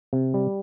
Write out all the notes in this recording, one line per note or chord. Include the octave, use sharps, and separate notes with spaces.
C3
G3